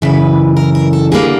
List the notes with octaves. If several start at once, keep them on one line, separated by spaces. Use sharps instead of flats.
F#2 C#3 E3 B4
A#4
A#4
A4
D3 G3 A#3 G#4